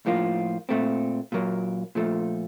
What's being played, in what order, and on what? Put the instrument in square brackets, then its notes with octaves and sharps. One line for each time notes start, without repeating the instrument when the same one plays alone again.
[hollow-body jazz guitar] A2 F3 A#3 F4
A#2 A3 C4
A#2 F#3 A#3
A#2 F3 A3